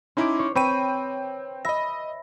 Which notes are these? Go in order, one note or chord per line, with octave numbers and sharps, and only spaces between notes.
C#4 D#4 E4 C6 D6
C#5
C4 B4 C#5 G5 D#7
D#5 E5 B5 A#6